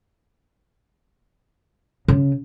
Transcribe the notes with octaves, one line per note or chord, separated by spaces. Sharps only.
C#3